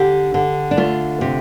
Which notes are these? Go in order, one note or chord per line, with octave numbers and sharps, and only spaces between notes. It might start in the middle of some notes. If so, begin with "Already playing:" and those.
Already playing: D3 G4
D3
D4
A3 F4
C3